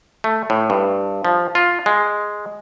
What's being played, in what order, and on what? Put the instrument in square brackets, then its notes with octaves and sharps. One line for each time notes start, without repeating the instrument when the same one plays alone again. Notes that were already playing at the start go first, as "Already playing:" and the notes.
[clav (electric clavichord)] A3
A2
G2
F3
F4
G#3